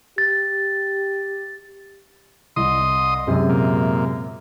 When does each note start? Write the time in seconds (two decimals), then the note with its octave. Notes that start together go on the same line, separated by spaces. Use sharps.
0.18 G4 A6
2.56 C2 D#5 C6 D#6
3.27 F#2 C3 G#3
3.49 A#2